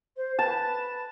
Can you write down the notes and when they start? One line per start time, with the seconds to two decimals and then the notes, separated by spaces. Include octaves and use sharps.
0.16 C5
0.39 B4 A5